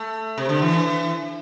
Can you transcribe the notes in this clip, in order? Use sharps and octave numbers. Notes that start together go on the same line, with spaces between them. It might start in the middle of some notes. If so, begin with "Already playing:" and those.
Already playing: A3
C3
D3
E3